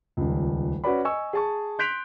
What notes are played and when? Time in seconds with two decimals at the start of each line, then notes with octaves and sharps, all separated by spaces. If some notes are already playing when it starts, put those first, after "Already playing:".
0.17 D#1 C#2
0.84 C#4 F#4 B4 D5 B5
1.05 D#5 G#5 C#6 E6
1.33 G#4 A5 C#6
1.79 C6 F#6 G6 B6 D7 F7